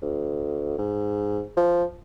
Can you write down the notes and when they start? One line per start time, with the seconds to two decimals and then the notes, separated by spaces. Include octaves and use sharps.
0.02 D2
0.78 G#2
1.57 F3